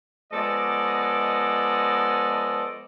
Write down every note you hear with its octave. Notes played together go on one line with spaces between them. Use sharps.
F3 G#3 B3 A4 D5 D#5